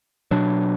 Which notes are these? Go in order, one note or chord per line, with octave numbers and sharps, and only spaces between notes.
B2 F#3 D4